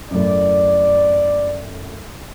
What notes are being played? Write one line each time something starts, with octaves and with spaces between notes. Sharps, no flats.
F#2 A2 D5